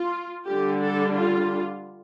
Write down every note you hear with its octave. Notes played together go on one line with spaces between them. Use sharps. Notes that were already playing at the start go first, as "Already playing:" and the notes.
Already playing: F4
D3 G3 D4 G4
A4
F4